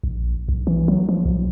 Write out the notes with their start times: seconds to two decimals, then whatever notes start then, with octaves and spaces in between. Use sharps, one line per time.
0.04 A#1
0.48 B1
0.67 E3
0.88 F#3
1.09 F3
1.25 B1